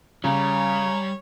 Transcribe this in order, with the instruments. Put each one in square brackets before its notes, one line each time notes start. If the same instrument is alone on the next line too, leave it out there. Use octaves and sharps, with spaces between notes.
[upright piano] C#3 [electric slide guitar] G3 [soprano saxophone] C#5 [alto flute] A#5